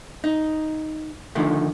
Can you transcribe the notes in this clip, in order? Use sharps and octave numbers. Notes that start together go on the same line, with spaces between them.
D#4
D3 D#3 F3 A3